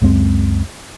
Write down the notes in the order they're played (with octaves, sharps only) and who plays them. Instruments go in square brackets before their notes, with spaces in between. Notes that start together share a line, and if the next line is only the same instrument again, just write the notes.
[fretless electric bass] C#2 F#2 G#3 C4